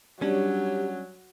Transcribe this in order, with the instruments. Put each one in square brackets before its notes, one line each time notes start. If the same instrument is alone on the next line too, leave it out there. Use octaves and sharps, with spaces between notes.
[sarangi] F#3 [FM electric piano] G3 D4 [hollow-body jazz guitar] C#4 [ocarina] G4